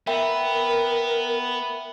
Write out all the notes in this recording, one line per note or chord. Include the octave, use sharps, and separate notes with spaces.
B3 A#4 E5 G5 B5